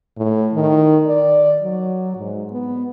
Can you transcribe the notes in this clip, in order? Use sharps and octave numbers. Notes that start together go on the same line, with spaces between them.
A2
D#3
D5
F#3
G#2
B3